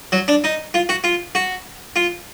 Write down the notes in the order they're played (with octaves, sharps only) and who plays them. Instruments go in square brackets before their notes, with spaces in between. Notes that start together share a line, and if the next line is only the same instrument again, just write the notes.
[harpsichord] F#3
D4
D#4
F4
F#4
F4
F#4
F4